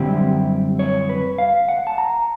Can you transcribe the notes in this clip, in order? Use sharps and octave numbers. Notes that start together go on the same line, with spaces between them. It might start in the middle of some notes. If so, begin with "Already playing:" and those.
Already playing: F#2 D3 G3 C4 E4 G4
C#5
B4
F5
F#5
A5
A#5